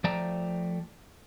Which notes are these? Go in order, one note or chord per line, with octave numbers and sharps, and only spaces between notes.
F3 A3 D5 G5 A5 A#5